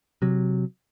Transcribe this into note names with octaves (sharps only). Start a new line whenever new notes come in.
C3 F#3